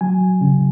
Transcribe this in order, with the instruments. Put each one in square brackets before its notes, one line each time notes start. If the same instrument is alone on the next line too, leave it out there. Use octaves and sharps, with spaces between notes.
[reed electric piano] F#3 G#5
C#3